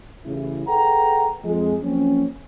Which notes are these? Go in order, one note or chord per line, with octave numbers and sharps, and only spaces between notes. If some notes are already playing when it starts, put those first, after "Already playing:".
A1 C#3 E4
G#4 A4 B4 F#5 G5 A#5
F2 G#3
F3 F#3 A#3 C4 C#4